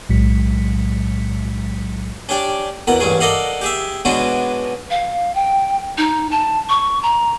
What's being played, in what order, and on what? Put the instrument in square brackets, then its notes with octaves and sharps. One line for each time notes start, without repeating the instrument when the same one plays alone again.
[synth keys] B1 A2 F#3 G#3 B6 C#7
[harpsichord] C#4 D4 G4 D5
E2 B2 A#4 F#5
A1 G2 C#4 G#4
A4 A#4 D5 D#5 F5 F#5
G4 G#4 E5
B2 G#3 B3 C#4 D4 F#4
[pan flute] F5
G5
D#4
A5
C#6
A#5